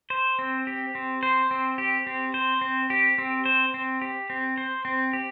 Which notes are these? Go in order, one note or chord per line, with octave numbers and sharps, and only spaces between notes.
C5
C4
G4
C4
C5
C4
G4
C4
C5
C4
G4
C4
C5
C4
G4
C4
C5
C4
G4